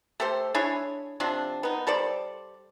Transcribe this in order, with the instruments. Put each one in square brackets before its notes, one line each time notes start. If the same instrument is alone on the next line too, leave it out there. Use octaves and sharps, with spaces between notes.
[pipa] A3 G4 A4 C5
D4 E4 G#4 C#5
C3 F3 C4 D4
B3 D#4
G3 A4 C5 D5